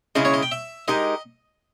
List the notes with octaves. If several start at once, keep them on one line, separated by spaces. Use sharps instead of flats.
C#3 G#3 C#4 E4 D#5
C#5
D#5
G5
E5
G#3 D#4 G4 A#4 D#5